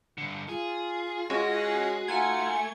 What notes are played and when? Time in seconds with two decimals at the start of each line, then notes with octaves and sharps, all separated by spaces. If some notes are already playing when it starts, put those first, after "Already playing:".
0.18 G2 D3
0.49 F4 G#4
1.30 G#3 C#4 F#4 G#4
2.08 A3 D#4 F4 F#4 G#5 C6 G#6